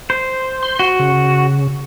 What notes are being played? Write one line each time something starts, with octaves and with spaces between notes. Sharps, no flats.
C5
C6
F#4
C#3